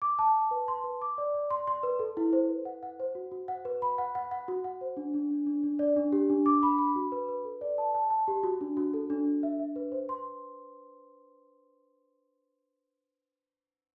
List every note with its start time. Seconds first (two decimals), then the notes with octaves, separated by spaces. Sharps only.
0.02 D6
0.19 A5
0.35 A5
0.51 B4
0.68 C6
0.84 B4
1.02 D6
1.18 D5
1.34 D5
1.51 C6
1.67 C6
1.83 B4
1.99 A4
2.17 E4
2.33 C5
2.49 B4
2.65 F#5
2.83 F#5
3.00 C5
3.15 F#4
3.31 F#4
3.48 F#5
3.65 B4
3.82 B5
3.98 F#5
4.15 F#5
4.31 F#5
4.48 F#4
4.64 F#5
4.81 C5
4.97 D4
5.14 D4
5.31 D4
5.46 D4
5.63 D4
5.79 D5
5.96 D4
6.12 G4
6.30 D4
6.46 D6
6.63 B5
6.78 B5
6.96 F#4
7.12 B4
7.29 B4
7.45 A4
7.61 D5
7.78 A5
7.95 A5
8.10 A5
8.28 G4
8.43 F#4
8.61 D4
8.77 F#4
8.94 A4
9.10 D4
9.26 D4
9.43 E5
9.59 E5
9.76 B4
9.92 C5
10.09 C6